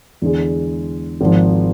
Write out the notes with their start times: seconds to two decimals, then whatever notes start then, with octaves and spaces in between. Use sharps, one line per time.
0.22 E2 D3 G#3
1.21 G#1 G#2 F3